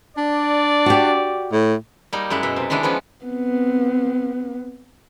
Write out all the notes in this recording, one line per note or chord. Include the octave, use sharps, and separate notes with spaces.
D4 D5
F#4 G4
A2
G3 A#3 D#4
F#2 G#3 E4 F#5
B2 E5
C3
D#3 E3 G#3 D4 E4
E3 F3 B3 C#4
B3 C4